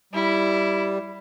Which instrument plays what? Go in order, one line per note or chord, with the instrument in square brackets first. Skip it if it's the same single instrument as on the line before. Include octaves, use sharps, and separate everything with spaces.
[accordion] G3 [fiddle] E4